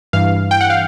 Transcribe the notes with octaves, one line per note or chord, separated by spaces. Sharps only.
G2 E3 F5
G5
F#5
F5